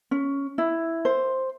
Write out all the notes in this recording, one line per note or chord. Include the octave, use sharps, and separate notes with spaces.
C#4
E4
C5